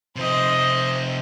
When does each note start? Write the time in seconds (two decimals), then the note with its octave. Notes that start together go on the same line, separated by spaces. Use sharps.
0.16 C3 F3 C5 D#5